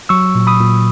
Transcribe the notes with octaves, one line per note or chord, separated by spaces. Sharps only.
F#3 C#6 E6
A#2
B5 D#6
A#2